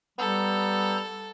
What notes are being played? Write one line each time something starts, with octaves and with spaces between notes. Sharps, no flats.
G3 B3 A4 A#5 E6 G6